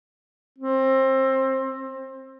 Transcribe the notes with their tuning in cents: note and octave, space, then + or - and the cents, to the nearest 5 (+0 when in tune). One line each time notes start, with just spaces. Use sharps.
C4 +25